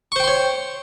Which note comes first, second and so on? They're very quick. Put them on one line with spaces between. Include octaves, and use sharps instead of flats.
C#6 C5 G5 C6 C#5